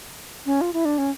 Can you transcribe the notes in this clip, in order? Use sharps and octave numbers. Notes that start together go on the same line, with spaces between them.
C#4
F4
E4
D4
C#4